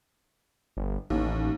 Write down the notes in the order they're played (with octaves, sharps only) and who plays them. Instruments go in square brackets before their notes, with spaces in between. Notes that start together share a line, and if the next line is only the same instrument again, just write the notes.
[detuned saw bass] G1
[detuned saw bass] A1 [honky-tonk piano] D#2